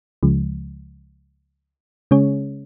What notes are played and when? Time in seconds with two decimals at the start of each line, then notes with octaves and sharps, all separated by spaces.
0.23 C#2 C#3 F3 G#3
2.11 C#3 G#3 C#4 G#4 C#5